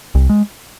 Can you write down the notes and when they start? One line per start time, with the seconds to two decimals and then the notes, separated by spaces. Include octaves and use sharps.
0.15 C2
0.29 G#3